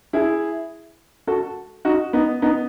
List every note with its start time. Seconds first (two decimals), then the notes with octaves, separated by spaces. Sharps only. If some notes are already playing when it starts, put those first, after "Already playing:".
0.13 E4 G#4
1.27 F#4 A4
1.85 D#4 F#4
2.13 B3 D#4
2.42 B3 D#4